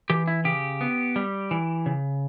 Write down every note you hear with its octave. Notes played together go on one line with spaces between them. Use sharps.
E3 G4
E4
C#3 G4
B3
G3
E3
C#3